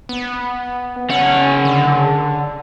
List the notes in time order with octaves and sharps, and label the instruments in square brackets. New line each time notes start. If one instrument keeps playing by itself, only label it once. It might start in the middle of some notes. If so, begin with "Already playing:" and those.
[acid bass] B3
[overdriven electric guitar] C#3 F#5 [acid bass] C#4
[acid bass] D3